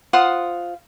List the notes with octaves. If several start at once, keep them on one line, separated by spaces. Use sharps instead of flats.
F4 C5 F#5 D#6